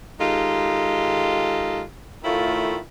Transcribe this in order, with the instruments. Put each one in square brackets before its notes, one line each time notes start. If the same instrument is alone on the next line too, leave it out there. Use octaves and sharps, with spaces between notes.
[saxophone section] D#3 G#3 D#4 F4 G4 A4
A2 D#3 A3 E4 F4